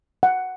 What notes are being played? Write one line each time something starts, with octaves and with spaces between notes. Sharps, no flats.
F#5